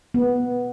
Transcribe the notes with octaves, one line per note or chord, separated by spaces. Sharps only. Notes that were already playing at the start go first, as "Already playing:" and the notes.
B3